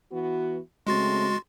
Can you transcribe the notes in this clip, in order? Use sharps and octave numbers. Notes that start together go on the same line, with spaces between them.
E3 B3 F#4
C#3 G#3 A3 C4 F#4 C6 A6